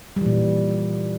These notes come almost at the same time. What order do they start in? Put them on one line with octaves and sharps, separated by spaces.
G3 E3 A#2